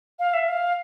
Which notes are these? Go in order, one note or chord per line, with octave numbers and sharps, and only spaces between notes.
F5
E5
F5